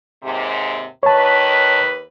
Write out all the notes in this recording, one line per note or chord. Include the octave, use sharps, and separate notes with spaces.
D#2 G#2 C3
D#2 D#3 B4 C#5 A5